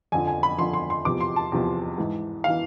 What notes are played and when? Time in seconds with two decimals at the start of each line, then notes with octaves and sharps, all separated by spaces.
0.12 F2 D3 F3 G#5
0.27 G#5
0.43 B5
0.58 F2 D3 F3 C6
0.73 C6
0.90 C6
1.04 E2 C3 F3 D6
1.20 C6
1.36 A5
1.52 E2 C3 F3
1.98 G#2 E3
2.44 E3 F5